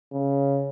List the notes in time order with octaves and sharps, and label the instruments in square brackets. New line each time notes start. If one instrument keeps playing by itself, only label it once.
[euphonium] C#3